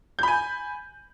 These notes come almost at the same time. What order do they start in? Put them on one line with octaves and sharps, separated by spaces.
G6 B5 G#5